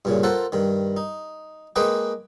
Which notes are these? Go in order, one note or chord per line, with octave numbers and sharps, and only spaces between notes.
G2 A#2 C#3
F4 A4 A#4 C5 F#5
G2 D#3
D#4
G#3 A#3 G#4 B4 D#5 G5